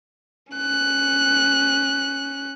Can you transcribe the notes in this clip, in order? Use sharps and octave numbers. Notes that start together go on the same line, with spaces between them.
C#4 F#6